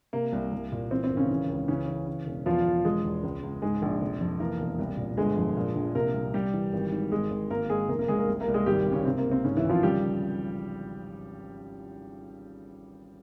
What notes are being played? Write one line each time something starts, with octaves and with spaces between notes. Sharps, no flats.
C3 A#3
C2
C2
A#2
E3 C4
C4
G#1
C#3 C#4
E3
C#2
C#3 E3 C#4
E3
C#3
E1
E2 F3 F4
E2
E1 G#3 G#4
E2
C#2
C#2
G#2 G#3 G#4
A#1
F1
F2
E3 A#3 A#4
E1
C2
A#2
G1 G#3 G#4
F2
A#2
A#1
C3 A#3 A#4
C2
C3 G3 G4
E3
G#1
G#2
G#1 G#3 G#4
G#1
G#1 A#3 A#4
G#1 G#3 G#4
F1 A#3 A#4
A#3 A#4
F1 G#3 G#4
A#3 A#4
C2
A#3 A#4
C2
G#3 G#4
G#1 G3 G4
G2
C#3 C#4
C3 C4
A#3
C#2
C4
G#2 C#3 C#4
E3 E4
G#1
F3 F4
C#3 G3 G4